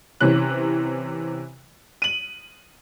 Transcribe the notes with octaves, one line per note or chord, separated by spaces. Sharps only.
C3 E3 C#4 F#6
D#7 F#7